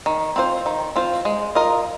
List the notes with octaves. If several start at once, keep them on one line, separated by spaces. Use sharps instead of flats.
D#3
C4 F4 C5
D#3
C4 F4 C5
G#3
F4 A#4 D#5